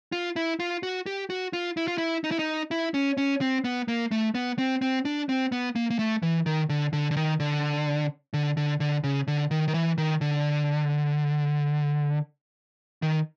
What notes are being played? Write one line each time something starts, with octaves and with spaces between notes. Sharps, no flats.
F4
E4
F4
F#4
G4
F#4
F4
E4
F4
E4
D#4
E4
D#4
E4
C#4
C#4
C4
B3
A#3
A3
B3
C4
C4
D4
C4
B3
A#3
A#3
A3
E3
D#3
D3
D3
D3
D#3
D3
D3
D3
D3
C#3
D3
D#3
D#3
E3
D#3
D3
D#3